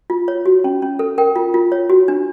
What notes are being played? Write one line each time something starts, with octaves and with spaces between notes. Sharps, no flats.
F4
C#5
F#4
C#4
C#4
A4
A#4 G5
F4
F4
C#5
F#4
D4